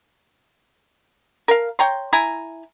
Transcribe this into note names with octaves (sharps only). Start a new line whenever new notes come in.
A#4 F5
C#5 G5 A#5 C6
E4 G#5 A#5